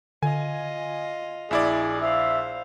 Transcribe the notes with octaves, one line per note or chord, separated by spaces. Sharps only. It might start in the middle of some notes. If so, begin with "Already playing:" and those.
D3 F4 D#5 G#5
A#1 E4 G#4 D5
C5 E5 F5